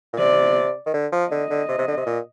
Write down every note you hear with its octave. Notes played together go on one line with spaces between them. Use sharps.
A#2
C3 D5
D#3
D3
F3
D3 D#5
D3
C3
C3
D3
C3
A#2